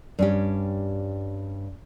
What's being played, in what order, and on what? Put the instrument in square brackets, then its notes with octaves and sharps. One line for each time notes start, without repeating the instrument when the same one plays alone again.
[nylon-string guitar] G2 C#4 G4